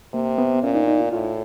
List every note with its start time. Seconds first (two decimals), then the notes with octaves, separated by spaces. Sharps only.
0.14 C3 A#3
0.38 B3
0.63 A#2 C#4
0.75 D#4
0.87 D#4
1.00 F4
1.13 A2 F4